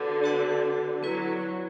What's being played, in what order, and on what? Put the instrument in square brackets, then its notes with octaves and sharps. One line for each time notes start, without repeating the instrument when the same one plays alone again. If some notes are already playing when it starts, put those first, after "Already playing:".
Already playing: [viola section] D3 [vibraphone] B3 F#4 B4 D5 F#5
[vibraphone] B3 F#4 B4 D5 F#5
[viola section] F#3 [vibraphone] B3 E4 B4